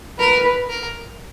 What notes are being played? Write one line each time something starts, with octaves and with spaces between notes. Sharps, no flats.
A#4 B4
A#4